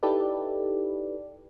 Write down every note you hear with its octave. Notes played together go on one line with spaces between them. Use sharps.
D#4 E4 G4 A4 B4 D5